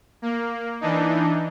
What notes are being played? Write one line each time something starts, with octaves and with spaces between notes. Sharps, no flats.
A#3
E3 D4 D#4